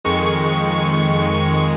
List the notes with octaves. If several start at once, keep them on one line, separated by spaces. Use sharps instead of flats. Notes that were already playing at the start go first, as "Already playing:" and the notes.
F2 D#3 G#3 C#6
C#6